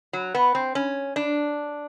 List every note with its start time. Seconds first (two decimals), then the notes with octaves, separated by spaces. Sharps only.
0.13 F#3
0.34 B3
0.55 C4
0.75 C#4
1.16 D4